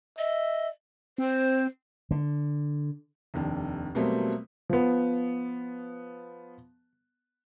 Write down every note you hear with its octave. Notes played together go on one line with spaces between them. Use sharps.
D#5 E5
C4 C5
D3
F1 D#2 D4
B2 F#3 G3 A3 A#3 C4
F3 B3